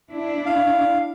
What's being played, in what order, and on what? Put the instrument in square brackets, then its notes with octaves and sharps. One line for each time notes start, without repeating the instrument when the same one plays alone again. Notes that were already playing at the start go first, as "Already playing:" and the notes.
[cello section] D4 E4
[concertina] F5